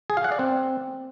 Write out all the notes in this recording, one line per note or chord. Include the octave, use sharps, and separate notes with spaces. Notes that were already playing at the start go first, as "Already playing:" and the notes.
G#4
F5
F#5
D5
C4